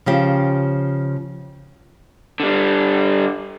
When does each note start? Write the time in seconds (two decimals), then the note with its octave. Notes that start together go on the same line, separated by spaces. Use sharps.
0.06 C#3 F3 G4
2.40 D3 G3